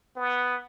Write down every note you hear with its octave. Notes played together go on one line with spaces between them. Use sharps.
B3